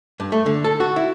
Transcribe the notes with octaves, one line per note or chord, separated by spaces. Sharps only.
G2
A3
D3
A4
F#4
E4